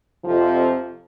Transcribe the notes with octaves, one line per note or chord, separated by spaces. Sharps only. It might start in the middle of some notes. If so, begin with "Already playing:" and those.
F2 C3 F3